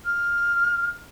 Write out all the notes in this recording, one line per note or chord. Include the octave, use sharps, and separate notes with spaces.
F6